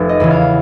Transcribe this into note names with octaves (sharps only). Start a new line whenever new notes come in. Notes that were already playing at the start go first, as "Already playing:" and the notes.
Already playing: F1 B4
D#5
E2 C#3 E3
F5